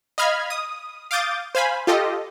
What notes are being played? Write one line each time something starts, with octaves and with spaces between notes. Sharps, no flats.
D#5 F5 B5 F6 G#6
D#6
F5 D6 D#6 G6 A6
C5 F5 G#5 B5
F4 G4 A4 D#5